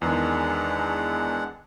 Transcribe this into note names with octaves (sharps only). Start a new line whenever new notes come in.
E2 D#3 G#3 D4 F#5